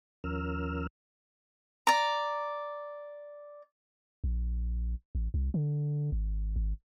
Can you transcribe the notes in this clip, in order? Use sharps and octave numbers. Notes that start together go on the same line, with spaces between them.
D#2 F3 C#4 A#4 E6 F6
D5 A#5
A#1
A1
C2
D3
G#1
G#1